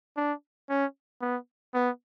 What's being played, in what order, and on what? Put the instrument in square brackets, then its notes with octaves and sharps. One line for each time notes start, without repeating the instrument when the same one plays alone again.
[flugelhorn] D4
C#4
B3
B3